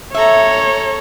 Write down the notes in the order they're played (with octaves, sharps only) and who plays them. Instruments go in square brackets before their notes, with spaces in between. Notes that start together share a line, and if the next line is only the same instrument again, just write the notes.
[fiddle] A4 A#5 [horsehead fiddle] C#5 [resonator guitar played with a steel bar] E5